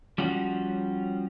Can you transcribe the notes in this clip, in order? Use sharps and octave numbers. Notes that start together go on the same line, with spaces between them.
F3 G3 C#4 F#4